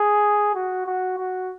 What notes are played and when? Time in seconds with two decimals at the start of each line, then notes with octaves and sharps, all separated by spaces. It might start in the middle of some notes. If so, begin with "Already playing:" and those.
Already playing: G#4
0.55 F#4
0.86 F#4
1.18 F#4